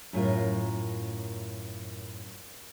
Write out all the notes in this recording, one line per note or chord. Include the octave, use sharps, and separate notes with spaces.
F#2 A2 F4 A#4